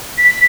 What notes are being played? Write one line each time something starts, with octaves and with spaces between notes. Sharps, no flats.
B6